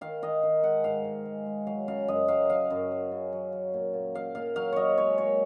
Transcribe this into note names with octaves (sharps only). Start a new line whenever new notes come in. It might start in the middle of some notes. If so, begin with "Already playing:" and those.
D#3 F5
D#3 D#5
D#3
G#3 F#5
G#2 F5
G#2
G#3
G#3
F#3 F5
C#3 F5
F#2 D#5
F#3 F5
F#3 F5
F#2
F#3
C#3
F#3
F#3
A#2
A#2
A#2 F5
A#2 F5
F#3 F5
F#3 C#5 D#5
G#3 C#5
A#2 C#5